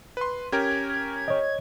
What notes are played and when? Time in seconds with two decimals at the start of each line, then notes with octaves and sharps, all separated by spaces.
0.17 B4 C6
0.52 C#4 G4 A#4 G#6
1.28 C#5 D#5